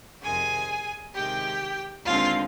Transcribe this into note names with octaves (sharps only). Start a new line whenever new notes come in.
F2 C3 D#3 G#4 G#5
C3 D#3 G#3 G4 G5
D#2 D3 G#3 C4 F4 F5